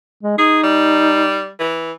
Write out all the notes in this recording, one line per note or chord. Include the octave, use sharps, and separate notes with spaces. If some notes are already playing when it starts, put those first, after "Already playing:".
G#3
D#4 G#4
G3
E3